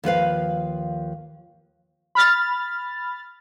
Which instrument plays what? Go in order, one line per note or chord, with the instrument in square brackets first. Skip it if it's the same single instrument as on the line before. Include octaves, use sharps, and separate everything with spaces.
[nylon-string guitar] D#2 F3 B4 F5
[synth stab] B5 F6 A6